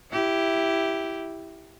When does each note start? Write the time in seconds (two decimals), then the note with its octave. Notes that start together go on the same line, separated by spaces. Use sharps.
0.11 E4 G4